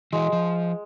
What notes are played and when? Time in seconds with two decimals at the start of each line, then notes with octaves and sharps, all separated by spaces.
0.13 E3 G#3 F#4
0.33 F3